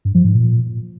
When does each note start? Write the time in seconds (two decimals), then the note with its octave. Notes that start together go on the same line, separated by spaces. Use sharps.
0.05 G2
0.15 F3
0.24 G#2
0.34 A#2